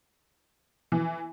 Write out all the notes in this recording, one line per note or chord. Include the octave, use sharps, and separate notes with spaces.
E3